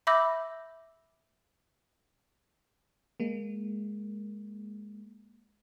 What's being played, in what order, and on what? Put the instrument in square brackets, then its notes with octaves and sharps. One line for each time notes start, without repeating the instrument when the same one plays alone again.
[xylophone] E5 B5 D6 E6 G6 A#6
[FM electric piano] G#3 A#3